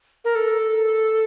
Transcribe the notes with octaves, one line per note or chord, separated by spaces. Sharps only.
A#4
A4